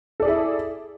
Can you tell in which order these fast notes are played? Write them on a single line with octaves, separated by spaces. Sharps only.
A4 D5 G#4 E4